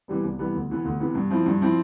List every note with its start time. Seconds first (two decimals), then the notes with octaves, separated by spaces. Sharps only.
0.08 C3 E3 G3 B3
0.23 C2
0.39 C3 E3 G3 B3
0.55 D2
0.70 C3 E3 B3
0.85 D2
1.00 C3 E3 B3
1.15 G2
1.31 F3 C4 E4
1.46 G2
1.62 F3 C4 E4